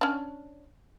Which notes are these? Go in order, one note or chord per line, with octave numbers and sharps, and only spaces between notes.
C#4 D4